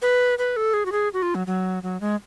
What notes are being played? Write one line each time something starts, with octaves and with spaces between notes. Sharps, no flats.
B4
B4
A4
G#4
F#4
G#4
F#4
F4
F#3
F#3
F#3
G#3